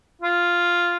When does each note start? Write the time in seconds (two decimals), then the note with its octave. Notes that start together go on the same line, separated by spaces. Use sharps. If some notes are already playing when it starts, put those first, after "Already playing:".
0.22 F4